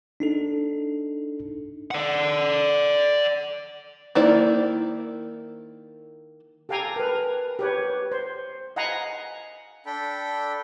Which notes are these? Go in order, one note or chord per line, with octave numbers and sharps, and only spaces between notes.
D4 D#4 A4
D5 F#5
D#3 A#3 E4 C5 D5
G4 A4 F5 G5 G#5 A#5
A#4 B4
G4 B4 C#5
C5
D#5 F5 F#5 G#5 A#5 B5
D4 A4 G5 B5